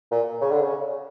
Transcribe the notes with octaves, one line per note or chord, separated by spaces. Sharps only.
A#2
C#3
D3
C#3